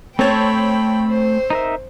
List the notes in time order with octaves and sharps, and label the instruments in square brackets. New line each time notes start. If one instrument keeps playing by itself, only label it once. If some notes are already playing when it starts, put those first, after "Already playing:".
[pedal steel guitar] A3 A5 [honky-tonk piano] C4 C#5 [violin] G5 B5
[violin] C5
[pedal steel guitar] D#4 A#4 E5